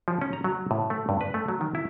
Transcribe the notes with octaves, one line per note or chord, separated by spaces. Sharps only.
F3
C#4
A#5
F#3
A2
A3
G2
B4
A3
F#3
D#3
E4